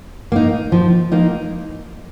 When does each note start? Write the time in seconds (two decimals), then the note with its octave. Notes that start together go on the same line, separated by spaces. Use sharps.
0.32 A#3 D#4
0.72 F3
1.12 A#3 D#4